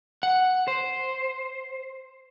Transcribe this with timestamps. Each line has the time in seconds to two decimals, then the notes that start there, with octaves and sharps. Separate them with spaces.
0.23 F#5
0.68 C5